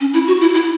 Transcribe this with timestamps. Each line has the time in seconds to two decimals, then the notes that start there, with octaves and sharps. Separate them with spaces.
0.01 C#4
0.14 E4
0.27 F#4
0.41 E4
0.54 E4